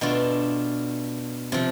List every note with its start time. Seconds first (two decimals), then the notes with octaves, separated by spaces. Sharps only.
0.01 B2 A3 D4 F4
1.52 C3 F3